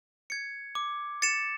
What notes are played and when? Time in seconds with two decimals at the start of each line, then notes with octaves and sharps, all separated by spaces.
0.30 G#6 C#7
0.75 D6
1.22 A6 C#7 E7